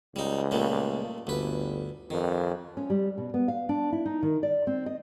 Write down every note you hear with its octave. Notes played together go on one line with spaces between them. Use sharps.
C#2 G3 D#4
A#2 G3 A3
G1 D2 B4
F2 D#3
C#4
G3
B2
B3
F5
D4
E4
D#4
D#3
D5
C4
D#5